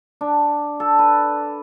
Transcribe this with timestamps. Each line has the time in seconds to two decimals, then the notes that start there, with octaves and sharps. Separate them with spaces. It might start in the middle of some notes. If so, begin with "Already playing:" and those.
0.21 D4
0.80 A4
0.99 B4